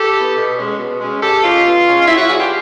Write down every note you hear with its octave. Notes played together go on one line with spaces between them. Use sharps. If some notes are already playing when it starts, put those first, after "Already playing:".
Already playing: G4 A4
B3 E4
B2
G#3 C#4
B2
G#3 C#4
B2 G4 A4
G#3 C#4 F4
B2
G#3 C#4
F#3 E4
E4 F#4
B3 D4 F#4 G#4
F4 G4